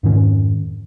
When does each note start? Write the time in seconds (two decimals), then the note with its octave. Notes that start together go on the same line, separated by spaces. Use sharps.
0.03 F2 G#2 D#3 C#4